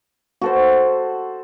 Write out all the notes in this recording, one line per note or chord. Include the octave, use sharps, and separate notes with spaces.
F#4 A4 C5